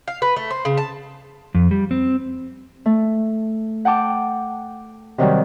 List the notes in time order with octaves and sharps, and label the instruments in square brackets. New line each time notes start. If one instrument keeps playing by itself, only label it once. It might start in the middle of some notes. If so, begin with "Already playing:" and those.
[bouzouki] F5
B4
A3
C5
C#3
A5
[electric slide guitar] F2
G3
C4
[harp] A3
F#5 G5 A5 D6
C3 D#3 F#3 G3